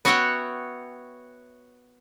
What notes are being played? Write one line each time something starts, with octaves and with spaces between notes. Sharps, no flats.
B3 F#4 C#5 E5 F#5 G5